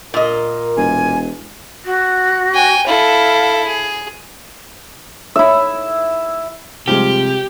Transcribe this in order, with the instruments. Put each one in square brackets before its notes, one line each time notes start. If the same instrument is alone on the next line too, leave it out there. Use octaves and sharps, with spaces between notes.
[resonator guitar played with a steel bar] A#2 D#5 [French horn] A#4
[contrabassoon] E1 [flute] G#5
[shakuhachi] F#4
[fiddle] G5 G#5
[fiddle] E4 A4 [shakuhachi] F5
[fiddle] G#4
[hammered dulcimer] E4 E5
[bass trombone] C3 [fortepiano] F3 G3 G#3 [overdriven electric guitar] G4